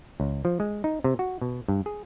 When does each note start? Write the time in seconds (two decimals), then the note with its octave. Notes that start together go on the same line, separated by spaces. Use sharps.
0.20 C#2
0.45 F3
0.60 G#3
0.84 D#4
1.04 C3
1.19 F#4
1.41 B2
1.69 G2
1.86 G#4